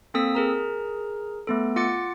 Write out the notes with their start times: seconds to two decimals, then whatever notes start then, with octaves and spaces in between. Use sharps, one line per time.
0.14 A#3 C4 A4 D#6 E6 B6
0.35 G#4 A#4 A#5
1.47 A3 B3 A4
1.76 F4 F#5 D6 A6 C#7